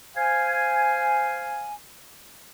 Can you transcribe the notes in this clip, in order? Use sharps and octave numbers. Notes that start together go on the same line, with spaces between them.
C5 F5 G#5